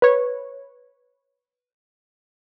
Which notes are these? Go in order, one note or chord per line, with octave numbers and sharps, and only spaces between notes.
B4 C#5